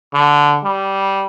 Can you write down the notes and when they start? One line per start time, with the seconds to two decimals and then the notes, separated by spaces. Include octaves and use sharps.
0.14 D3
0.64 G3